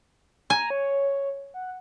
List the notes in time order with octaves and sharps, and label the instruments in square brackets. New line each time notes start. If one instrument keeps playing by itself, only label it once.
[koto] G#5 [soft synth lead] A#5
[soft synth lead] C#5
F#5